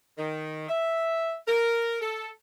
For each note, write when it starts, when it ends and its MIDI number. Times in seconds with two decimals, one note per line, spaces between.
0.18 0.66 51
0.68 1.34 76
1.47 1.97 70
2.01 2.29 69